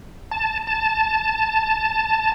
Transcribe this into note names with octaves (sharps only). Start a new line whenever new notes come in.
A5
A5